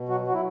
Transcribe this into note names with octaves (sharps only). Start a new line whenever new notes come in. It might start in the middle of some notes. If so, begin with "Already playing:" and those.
Already playing: B2
F#3 F#4
F#3 F#4
E4